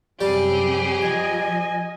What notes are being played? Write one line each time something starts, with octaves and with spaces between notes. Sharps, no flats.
F#2 C3 G3 G4 G#4
F3 D#5 G#5